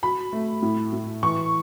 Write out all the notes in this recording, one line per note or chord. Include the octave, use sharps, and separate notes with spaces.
F#3 B5
A3
A2
A2
E3 C#6